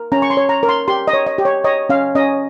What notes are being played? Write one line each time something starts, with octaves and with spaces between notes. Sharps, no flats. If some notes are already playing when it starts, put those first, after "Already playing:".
Already playing: A#4
C#4 A#5
C#6
C6
C#5
A#5
A#4
C6
G4 C6
D#5
C#5
D#5
G4
C#5
C#5 D#5
C#4 F5
C#4 D#5